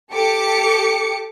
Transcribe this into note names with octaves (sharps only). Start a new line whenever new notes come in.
G4 A4 D6 C#7